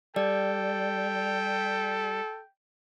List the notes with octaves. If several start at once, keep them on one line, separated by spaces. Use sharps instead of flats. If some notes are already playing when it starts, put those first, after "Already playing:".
G3 A4 D5 G5